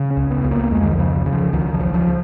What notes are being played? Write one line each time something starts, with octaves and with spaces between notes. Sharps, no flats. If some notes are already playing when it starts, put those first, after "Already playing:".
Already playing: C#3
C#4
C#2
B3
C#2
A#3
F2 G#3
D#3
F3
C#3
C#3
F3
C#2 D#3
F3
C#2
F3